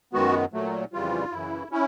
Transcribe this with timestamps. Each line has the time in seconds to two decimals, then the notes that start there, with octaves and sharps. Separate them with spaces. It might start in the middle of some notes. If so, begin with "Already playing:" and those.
0.13 F#2 D#3 G#3 B3 F#4
0.53 A#2 F#3 A3
0.93 F2 C#3 E3 G3 F4
1.32 F#2 C#3 E3 E4
1.71 C#4 E4